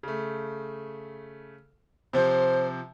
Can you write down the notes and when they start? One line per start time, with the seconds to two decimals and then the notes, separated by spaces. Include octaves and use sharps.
0.03 C#3 A3
2.13 C3 F3 C5